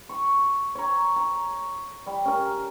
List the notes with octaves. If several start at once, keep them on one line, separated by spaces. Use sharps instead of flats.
C#6
C#5 A#5
A#5
G3
C#4 A#4